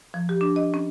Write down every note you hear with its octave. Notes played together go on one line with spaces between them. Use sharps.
F3
G4
D4
D#5
C#4